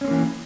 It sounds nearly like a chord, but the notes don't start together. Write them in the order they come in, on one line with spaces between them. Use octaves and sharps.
C#4 C4 A#3 E3